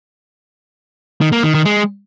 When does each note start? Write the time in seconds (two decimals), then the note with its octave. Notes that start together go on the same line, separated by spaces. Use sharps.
1.21 D#3
1.32 A#3
1.43 D#3
1.54 D#3
1.65 G#3